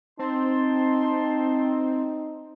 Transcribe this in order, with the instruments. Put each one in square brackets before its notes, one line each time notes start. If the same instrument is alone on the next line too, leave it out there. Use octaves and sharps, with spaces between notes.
[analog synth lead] C4 [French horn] D#4 [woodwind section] A5 C6